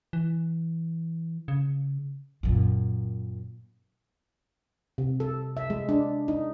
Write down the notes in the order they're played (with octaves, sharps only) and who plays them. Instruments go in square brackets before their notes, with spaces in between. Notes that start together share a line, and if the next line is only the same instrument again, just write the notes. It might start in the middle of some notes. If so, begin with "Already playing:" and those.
[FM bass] E3
C#3
[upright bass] F#2 A#2
[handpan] C3
A4
E5
G#3
D4
D#4